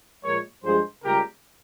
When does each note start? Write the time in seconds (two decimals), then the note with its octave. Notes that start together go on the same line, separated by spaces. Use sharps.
0.23 A#2 F3 G#3 A#4 C#5
0.64 G2 F3 G#3 G#4 C5
1.04 C#2 C#3 G3 A#3 G4 A#4